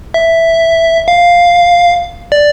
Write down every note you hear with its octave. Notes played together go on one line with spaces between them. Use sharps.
E5
F5
D5